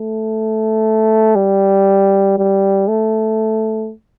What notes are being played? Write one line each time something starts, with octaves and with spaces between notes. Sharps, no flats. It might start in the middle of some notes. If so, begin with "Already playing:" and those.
Already playing: A3
G3
G3
A3